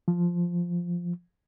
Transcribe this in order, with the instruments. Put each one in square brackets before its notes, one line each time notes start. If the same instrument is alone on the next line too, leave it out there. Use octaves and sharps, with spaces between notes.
[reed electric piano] F3